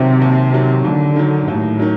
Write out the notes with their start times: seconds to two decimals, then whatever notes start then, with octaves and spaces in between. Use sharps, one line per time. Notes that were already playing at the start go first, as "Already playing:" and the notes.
Already playing: D#2 C3 D#3 F#3
0.21 D#2
0.53 D#3 F#3
0.84 D#2 D3
1.16 D#3 F#3
1.47 D#2 A2
1.79 D#3 F#3